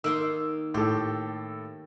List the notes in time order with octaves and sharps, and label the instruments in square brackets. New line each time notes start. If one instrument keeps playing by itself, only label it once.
[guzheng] D#3 A#3 C6 [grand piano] E6
[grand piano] A2 A4 [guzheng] G4